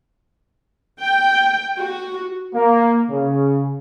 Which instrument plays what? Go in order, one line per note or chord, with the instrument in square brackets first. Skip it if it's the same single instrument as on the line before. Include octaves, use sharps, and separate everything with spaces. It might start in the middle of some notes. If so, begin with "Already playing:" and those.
[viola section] G5
F#4
[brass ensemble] A#3
C#3